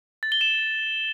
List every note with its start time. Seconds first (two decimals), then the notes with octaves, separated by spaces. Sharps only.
0.23 A6
0.32 G7
0.41 E7